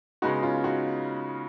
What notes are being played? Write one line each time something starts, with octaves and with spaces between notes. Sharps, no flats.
C#3 G#3 B3 D#4 F#4
C#4 F4
D#4 F#4